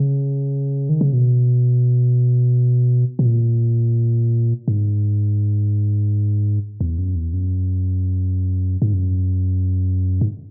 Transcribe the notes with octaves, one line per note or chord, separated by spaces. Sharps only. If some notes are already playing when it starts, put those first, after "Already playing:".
Already playing: C#3
D#3
C#3
B2
B2
A#2
G#2
E2
F#2
E2
F#2
G#2
F#2
G#2